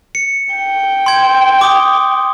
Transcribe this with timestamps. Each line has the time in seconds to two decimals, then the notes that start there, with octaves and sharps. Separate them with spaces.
0.15 C#7
0.54 G5
1.06 C6 G#6
1.61 D6 D#6